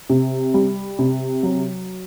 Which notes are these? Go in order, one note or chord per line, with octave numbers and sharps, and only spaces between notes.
C3
G3
C3
F#3